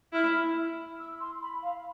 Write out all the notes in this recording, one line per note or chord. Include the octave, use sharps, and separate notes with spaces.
E4 F6
E6
C6
B5
F5